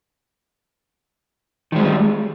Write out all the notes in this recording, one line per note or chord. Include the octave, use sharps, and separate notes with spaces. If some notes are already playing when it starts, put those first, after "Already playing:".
D#3 G3 G#3